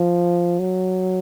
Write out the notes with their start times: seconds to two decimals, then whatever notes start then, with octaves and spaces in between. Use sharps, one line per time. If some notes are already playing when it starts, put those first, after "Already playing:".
Already playing: F3
0.59 F#3